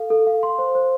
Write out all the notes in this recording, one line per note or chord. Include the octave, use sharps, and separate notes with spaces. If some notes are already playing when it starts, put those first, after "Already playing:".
Already playing: A4 F5
A4
F5
C6
C5
C5